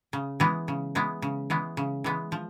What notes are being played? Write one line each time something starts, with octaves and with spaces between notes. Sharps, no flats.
C#3
E3 G#3 B3
C#3
E3 G#3 B3
C#3
E3 G#3 B3
C#3
E3 G#3 B3
F3